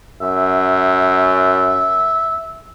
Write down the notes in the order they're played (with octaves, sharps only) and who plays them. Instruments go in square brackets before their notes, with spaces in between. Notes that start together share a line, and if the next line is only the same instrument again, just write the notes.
[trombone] F#2 [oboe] E5